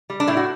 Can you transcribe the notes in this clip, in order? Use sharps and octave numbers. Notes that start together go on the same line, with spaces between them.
G3
D4
A2 E4
F#4